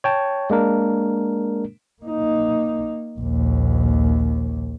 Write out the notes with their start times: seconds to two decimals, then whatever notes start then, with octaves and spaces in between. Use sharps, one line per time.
0.04 C#5 G5 A5
0.50 G#3 A#3 D4 A#4
2.03 A#3 D#4
3.18 A#1 D#2